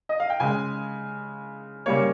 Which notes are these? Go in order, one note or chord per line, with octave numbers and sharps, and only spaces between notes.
D#5
F5
G5
C#3 G#3 G#5
C#3 G3 A#3 C#5